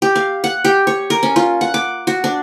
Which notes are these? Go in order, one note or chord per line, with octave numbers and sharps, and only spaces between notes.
G4
F5
F#5
G4
C#5
A#4
C#4
F4
F#5
D6
F#4
D4